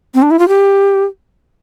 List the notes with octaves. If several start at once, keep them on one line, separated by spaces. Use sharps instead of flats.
C4
D4
E4
F4
G4